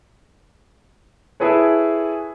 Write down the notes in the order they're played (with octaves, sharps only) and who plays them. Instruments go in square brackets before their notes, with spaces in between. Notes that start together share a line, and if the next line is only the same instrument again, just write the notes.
[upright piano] E4 G#4 A4 B4 C#5